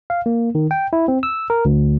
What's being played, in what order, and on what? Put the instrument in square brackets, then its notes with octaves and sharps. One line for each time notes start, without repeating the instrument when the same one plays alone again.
[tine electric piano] F5
A#3
D#3
G5
E4
C4
E6
A#4
D2